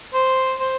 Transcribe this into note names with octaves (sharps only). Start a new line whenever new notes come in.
C5
C5